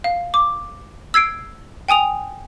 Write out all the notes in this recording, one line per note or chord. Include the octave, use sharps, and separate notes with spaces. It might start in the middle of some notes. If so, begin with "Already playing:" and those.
F5
D6
E6 G#6 C7 D7
G5 G#5 D#6 F7